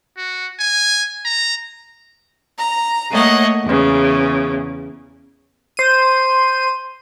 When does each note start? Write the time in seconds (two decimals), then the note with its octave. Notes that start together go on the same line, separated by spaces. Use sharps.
0.18 F#4
0.60 G#5
1.25 A#5
2.57 A#5
3.11 A3 A#3 C#5 D#5 F#5
3.64 E2 C#3
5.77 C5 D#7